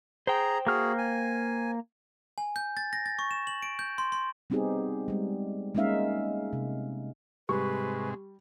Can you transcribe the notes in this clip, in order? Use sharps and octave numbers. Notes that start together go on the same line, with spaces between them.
G#4 C5 G5 A#5
A#3 F#4 G#4 F6
G#5
G#5
G6
A6
A#6
A6
C#6
E7
F#7
D7
G6
C6
C6
G3 B3 C4 D#4 G4 G#4
G3 G#3
G#3 A#3 C#4 D#4 E5 F5
C3
G#2 C3 G3 G#3 B4 C#6